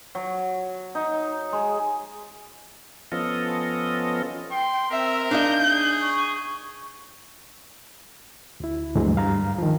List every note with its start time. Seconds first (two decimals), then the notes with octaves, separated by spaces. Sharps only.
0.15 F#3
0.95 D#4
1.53 G#3
3.12 F3 B3 C#4 F4 A4 D#5
4.51 G5 C6
4.91 C4 A#4 E5
5.31 D4 D#4 E5 F5 G6
5.70 G#4 D5
6.00 C#6
8.60 D2 E4
8.96 D2 G2 D3 E3 F#3 G#3
9.16 G2 F5 A#5
9.58 D#3 F3